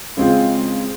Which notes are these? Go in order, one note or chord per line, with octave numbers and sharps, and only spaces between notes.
C#3 G#3 C4 F4 G#4